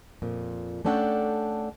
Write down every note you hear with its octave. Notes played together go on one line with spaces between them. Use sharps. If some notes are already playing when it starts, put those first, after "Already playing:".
F2 A#2
A3 C#4 D4 A4 F#5 G5